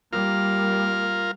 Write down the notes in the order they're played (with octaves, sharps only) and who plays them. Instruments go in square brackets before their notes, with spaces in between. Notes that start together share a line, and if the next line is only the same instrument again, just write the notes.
[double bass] G3 A#3 [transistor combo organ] F4 A#4 F5